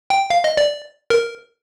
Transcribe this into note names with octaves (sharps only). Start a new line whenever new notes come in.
G5
F5
D#5
D5
A#4